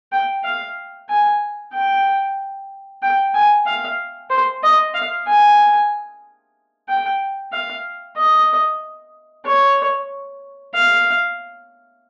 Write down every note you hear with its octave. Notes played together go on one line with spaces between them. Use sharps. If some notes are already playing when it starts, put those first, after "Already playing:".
G5
F5
G#5
G5
G5
G#5
F5
C5
D#5
F5
G#5
G5
F5
D#5
C#5
F5